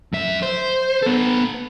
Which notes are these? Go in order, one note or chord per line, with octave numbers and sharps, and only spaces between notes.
F#2 E5
C5
B3 A4